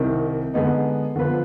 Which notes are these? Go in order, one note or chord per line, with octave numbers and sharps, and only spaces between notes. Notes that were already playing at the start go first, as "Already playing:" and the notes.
Already playing: C2 C3 D#3
D3 G#3 B3 D#4
D3 F3 B3 F4 B4